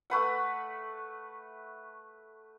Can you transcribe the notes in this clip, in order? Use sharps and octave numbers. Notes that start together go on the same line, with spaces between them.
A3 B4 F#5